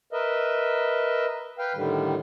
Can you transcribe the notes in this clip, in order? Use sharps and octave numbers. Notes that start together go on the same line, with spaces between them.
A#4 B4 D#5 E5
B4 F5 G5
A2 D3 D#3 G3